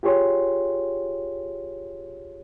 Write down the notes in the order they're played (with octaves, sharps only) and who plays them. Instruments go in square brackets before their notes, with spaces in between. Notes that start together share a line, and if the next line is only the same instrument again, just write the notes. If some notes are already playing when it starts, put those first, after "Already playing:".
[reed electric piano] F4 G4 G#4 C#5 C6